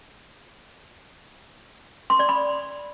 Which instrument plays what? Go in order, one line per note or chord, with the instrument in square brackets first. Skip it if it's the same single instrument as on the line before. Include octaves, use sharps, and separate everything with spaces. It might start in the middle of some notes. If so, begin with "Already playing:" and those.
[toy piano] C6
D5
B5